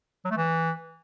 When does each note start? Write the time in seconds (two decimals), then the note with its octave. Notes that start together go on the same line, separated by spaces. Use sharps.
0.25 F#3
0.31 A3
0.37 E3